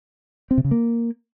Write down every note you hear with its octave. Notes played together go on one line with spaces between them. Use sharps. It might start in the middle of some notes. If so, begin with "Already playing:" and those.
C4
C3
C#3
A#3